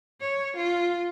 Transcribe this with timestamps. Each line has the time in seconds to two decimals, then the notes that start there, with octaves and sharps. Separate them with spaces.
0.21 C#5
0.57 F4